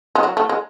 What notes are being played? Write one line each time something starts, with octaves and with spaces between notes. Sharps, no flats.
G#3
F#3
A3
G#3